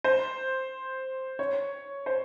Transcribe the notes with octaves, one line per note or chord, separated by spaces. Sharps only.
C5
C#5
C5